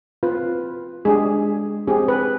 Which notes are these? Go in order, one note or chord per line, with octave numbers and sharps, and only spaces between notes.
C4 F4 B4
G#3 D4 G4 G#4
C4 G4 G#4
B4